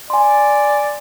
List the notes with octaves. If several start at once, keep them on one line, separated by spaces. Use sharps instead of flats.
D5 G#5 C6